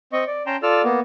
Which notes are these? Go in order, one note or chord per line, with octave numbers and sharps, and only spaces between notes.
C4 D#5 C#6
D5
C#4 G5 A5 A#5 C6
F4 A4 D5 E6 F6
A#3 B3